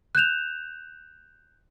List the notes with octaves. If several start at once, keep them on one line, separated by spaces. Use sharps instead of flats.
F#6 G6 E7 F7